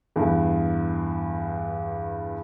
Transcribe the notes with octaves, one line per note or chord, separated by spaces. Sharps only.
E2 G2